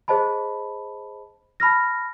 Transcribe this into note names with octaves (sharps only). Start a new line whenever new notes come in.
G#4 C5 D#5 A5 B5
A5 B5 F6 A#6